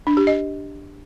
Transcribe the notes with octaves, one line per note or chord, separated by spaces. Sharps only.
D4
G4
D#5